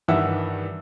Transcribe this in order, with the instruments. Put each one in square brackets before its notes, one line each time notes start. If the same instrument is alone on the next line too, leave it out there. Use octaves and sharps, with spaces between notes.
[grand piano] G2 D#3 E3 E5 F#5 E6